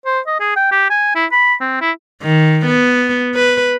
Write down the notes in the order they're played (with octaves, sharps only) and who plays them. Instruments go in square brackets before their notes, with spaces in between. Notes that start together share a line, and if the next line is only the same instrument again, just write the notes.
[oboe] C5
D#5
G#4
G5
G4
G#5
E4
B5
C4
E4
[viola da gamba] D#3
B3
B4